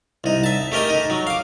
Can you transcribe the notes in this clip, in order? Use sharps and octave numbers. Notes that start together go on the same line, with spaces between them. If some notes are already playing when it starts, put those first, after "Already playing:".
C2 D#4
E5 A5
A3 G4 A#4 D#5 G#5
D#4
F#3
F5 D6